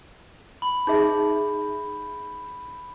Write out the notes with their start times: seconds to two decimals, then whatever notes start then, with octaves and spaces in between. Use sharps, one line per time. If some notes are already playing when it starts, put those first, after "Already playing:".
0.62 B5
0.87 D#4 G#4 E5 G6